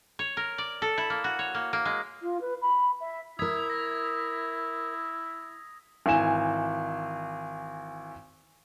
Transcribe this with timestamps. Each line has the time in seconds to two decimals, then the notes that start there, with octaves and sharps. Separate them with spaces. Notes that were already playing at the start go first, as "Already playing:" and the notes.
0.19 C#5
0.37 A#4
0.58 D5
0.82 A4
0.98 E4
1.10 A#3
1.24 F#4
1.39 C#5
1.55 A#3
1.73 A#3
1.85 G#3
2.22 F4
2.41 B4
2.61 B5
3.00 E5
3.39 E4 A#4 E5 D#6 G#6 B6
3.70 A#6
6.06 G#1 E3 G#5 E7